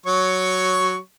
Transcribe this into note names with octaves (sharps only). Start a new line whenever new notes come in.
F#3 C#5 C#6